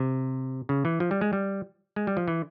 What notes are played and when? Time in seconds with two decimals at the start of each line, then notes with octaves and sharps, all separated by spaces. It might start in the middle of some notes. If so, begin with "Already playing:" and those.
Already playing: C3
0.69 C#3
0.85 E3
1.00 F3
1.11 G3
1.21 G#3
1.33 G3
1.96 G#3
2.07 G3
2.17 F3
2.28 E3